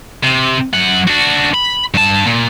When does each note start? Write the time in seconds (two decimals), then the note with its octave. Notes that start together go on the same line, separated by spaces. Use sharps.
0.23 C3
0.74 F#2 F#5
1.08 D4 F#4
1.54 B5
1.94 G2 A5
2.26 A#2